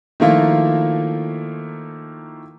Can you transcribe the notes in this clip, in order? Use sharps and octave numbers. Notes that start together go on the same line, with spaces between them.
D#3 F3 A3 A#3 E4 F4